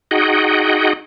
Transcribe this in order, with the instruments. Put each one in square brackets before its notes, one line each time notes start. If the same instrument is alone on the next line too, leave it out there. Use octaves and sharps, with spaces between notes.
[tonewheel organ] D#4 F#4 G#4 D#5 F#5 G5